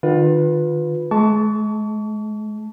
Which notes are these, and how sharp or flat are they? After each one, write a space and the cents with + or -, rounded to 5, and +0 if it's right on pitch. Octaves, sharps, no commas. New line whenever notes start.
D#3 -35 F4 +25 B4 +0
G#3 +40 A5 +0 C#6 +40